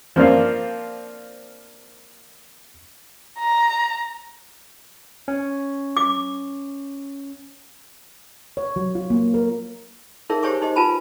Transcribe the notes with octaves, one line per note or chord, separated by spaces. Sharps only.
F3 A#3 C4 D4 F4
A#5
C#4
D6
C#5
F#3
F4
A#3
A#4
D#4 G#4 A#4 C#5 E5
G4 C5 C#5 G#5 C#6 D6
D#4 G4 C5 D#5
F4 B4 G#5 A5 B5